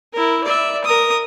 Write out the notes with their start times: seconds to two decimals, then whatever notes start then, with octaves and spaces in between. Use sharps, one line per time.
0.13 E4 A#4
0.44 D5 E5
0.84 A#4 D#6